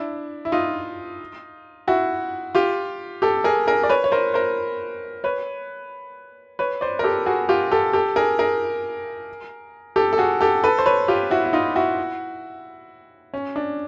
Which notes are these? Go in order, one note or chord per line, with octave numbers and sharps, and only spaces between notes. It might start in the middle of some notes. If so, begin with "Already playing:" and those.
Already playing: D4 E4
E4
D#4 F4
E4 F#4
F4 G4
G4 A4
G#4 A#4
G#4 A#4
D5
B4 C#5
C#5
A#4 C5
A#4 C5
B4 C#5
B4 C#5
C5 D5
A#4
G4 A4
F#4 G#4
F4 G4
G4 A4
G4 A4
G#4 A#4
G#4 A#4
G4 A4
A4
F#4 G#4
G4 A4
A4 B4
C5
B4 C#5
F4 G4
E4 F#4
E4
D#4 F4
E4 F#4
C#4
D4